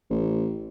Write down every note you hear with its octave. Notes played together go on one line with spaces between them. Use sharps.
A1